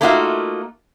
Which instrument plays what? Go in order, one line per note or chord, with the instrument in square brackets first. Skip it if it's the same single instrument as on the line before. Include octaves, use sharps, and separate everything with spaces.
[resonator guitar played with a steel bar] A3 A#3 D#4 F4 F#4 E5